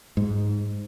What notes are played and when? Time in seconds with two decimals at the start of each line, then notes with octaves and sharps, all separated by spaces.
0.17 G#2